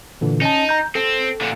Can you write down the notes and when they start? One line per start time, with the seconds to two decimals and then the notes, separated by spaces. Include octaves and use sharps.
0.21 A#2 D3 E3
0.42 C#4 D#4 A5
0.69 A#5 G6
0.95 C4 A4
1.41 A#2 D3